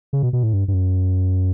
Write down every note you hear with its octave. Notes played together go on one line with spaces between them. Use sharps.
C#3
B2
B2
A2
G2
G2
F#2